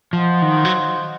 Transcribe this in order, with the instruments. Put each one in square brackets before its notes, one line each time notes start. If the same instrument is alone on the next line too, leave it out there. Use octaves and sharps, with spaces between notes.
[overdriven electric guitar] F3 [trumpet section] F4 C5 D#5 F#5
[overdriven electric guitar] D#3
F#3